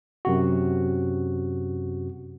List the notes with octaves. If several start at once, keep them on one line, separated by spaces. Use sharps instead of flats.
F#2 C3 F#4